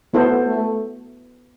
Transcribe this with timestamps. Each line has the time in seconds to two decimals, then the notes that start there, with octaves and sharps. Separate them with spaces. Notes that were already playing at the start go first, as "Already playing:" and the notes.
0.14 A3 B3 E4 A4 C5
0.47 A3